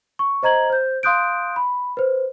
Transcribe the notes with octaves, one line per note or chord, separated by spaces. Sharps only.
C#6
C5 D#5 A#5 G#6 F#7
C5 G6
F5 C6 D#6 F#6 G6 D7
B5
B4 C5